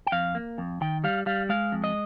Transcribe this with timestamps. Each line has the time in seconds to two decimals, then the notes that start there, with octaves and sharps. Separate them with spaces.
0.07 G5
0.12 F2 F5
0.35 A#3
0.58 F2
0.81 D#3 G5
1.04 G3 F5
1.26 G3 F5
1.49 G#3 F5
1.72 F2
1.84 D#5